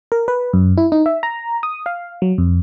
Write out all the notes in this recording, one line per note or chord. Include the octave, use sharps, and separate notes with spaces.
A#4
B4
F#2
E4
D#4
E5
A#5
D#6
F5
F#3
F2